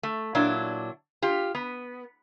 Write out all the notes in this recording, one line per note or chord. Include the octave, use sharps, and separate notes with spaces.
A3
A#2 F#3 D4 E4
F4 G4
B3